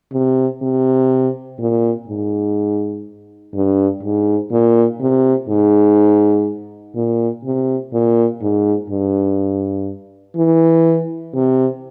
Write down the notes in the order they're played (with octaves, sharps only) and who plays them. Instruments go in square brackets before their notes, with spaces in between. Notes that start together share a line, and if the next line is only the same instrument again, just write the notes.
[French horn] C3
C3
A#2
G#2
G2
G#2
A#2
C3
G#2
A#2
C3
A#2
G#2
G2
E3
C3